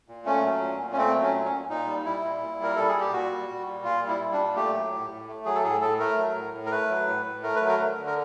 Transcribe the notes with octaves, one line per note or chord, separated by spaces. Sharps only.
A#2
A3 C#4
F#3
A#2
A#2
C#4
A3 C4
F#3
C#4
A#2
C#4
A#2
A#2 D#4
G3
G3 E4
A#2
A#2
G3 A#4
G3 A4
G#4
A#2
G4
A#2 F#4
G3
G3
A#2
A#2 F4
G3
E4
G3
D4
A#2
A3 G4
F#3
A2
A2
A3
F#3 G#4
A4
A2 G#4
A2 A4
A3 A#4
F#3
A2
A2
A#4
A3 B4
F#3
A2
A2
A3 A#4
B4
F#3
A#4
D3
D3
A#4